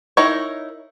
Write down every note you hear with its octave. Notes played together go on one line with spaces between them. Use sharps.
D#4 E4 A#4 C#5